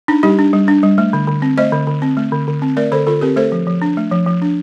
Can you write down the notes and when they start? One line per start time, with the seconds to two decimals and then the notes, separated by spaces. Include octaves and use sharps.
0.08 D4 D#4
0.23 G3 D#4 G4
0.39 D4
0.53 G3
0.68 D4
0.83 G3
0.98 A3
1.13 D3
1.27 D3
1.42 C4
1.58 A3 C5 D#5
1.72 D3
1.87 D3
2.02 C4
2.17 A3
2.32 D3
2.48 D3
2.62 C4
2.77 A3 A#4 D5
2.92 D3 A4 C5
3.07 D3 F4 A4
3.21 C4 G4 A#4
3.36 A3 A4 C5
3.52 F3
3.67 F3
3.82 D4
3.97 A3
4.11 F3
4.26 F3
4.42 D4